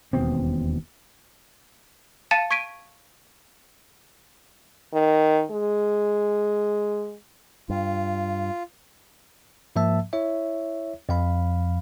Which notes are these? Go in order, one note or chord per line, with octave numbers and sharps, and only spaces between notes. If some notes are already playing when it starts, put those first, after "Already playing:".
E1 D#2 B2 C4
F5 A5 A6 C#7 D#7 E7
C#6 G#6 B6 D7 D#7
D#3
G#3
G2 F4
G#2 F3 A#3 E5 A5 E6
E4 C#5 E5
F2 F3 F5 B5